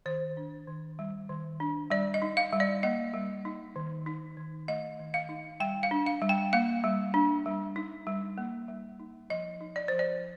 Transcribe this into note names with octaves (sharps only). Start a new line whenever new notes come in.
D#3 C5
D4
D#3
G3
D#3
D4
G3 D5
D#5
D#4
F5
G3
D5
A#3 D#5
G3
D#4
D#3
D#4
D#3
A3 D#5
D#3
F5
D#4
G3 G5
F5
D4
F5
G3
G5
A#3 F5
G3
D4
G3
D#4
G3
A#3
G3
D#4
F3 D#5
D#4
D5
F3 C5
D5